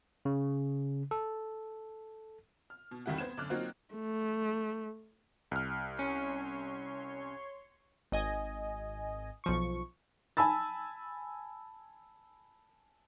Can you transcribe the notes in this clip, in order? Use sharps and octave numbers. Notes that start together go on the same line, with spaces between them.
C#3
A4
F6
B2
F1 C#2 D#3 G3 E4 F#5
B3 C5 G#6 E7
F#2 D3 D6 F6 F#6
F#3 A#3 C4 D#4 F4 F#4
A3
C2 F6
C#4 C#5 C6 C#6
G#1 D#5 G#5
B1 F3 C#6
G#5 A5 B5 E6 A6